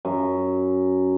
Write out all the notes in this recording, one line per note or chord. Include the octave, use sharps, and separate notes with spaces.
F#2